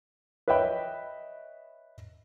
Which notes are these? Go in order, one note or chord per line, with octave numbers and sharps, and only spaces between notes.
B4 C#5 D#5 E5 G5 B5